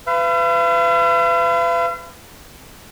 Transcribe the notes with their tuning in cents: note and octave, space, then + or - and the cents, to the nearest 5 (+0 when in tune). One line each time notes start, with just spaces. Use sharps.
B4 +30 F5 -45